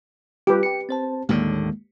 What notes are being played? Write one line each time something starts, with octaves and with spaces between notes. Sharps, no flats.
G3 F4 G4 B4
G5 C#7
C4 C5 A5
D#2 A2 D3 G#3 A#3